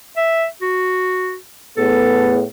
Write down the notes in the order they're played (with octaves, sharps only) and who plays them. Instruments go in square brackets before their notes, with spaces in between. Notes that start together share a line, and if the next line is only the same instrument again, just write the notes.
[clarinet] E5
F#4
[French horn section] A2 B3 G#4 [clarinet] A4